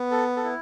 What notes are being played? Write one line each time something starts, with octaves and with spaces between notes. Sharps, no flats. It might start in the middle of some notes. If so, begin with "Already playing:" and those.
Already playing: B3
A4
A4
E4